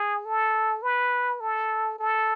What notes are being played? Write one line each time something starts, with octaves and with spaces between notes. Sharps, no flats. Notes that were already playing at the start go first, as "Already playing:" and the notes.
Already playing: G#4
A4
B4
A4
A4